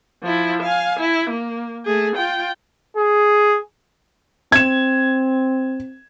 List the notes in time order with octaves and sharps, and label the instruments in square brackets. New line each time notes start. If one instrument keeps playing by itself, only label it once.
[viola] F3 E4
F5 G#5
E4
A#3
A3 G#4
F4 G5
[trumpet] G#4
[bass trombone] C4 [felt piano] G#6 E7